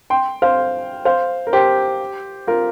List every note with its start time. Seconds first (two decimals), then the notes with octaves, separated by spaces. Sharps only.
0.10 G5 C6
0.42 C5 F5
1.05 C5 F5
1.47 A#4
1.53 G4 C5
2.47 F4 A#4